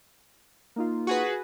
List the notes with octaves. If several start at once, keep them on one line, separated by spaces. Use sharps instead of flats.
A#3 D#4 F4
F#4 G#4 B4